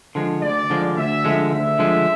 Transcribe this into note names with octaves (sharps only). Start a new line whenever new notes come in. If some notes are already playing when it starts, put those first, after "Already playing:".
D3 F3 G#3
D2 D5
D3 F3 G#3
D2 E5
D3 F3 G#3
D2 E5
D3 F3 G#3